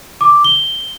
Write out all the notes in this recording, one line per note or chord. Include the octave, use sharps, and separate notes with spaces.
D6
G7